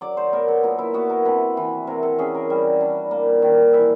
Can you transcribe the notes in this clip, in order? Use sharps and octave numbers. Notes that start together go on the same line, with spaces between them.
F#3 D5
C5
B3 A#4
A4
A#2 D#4
E4
B3 F#4
A#4
C3 B4
E3
C3 A#4
A4
C#4 G#4
A#4
G3
D4
A#3
D#3
E3 E5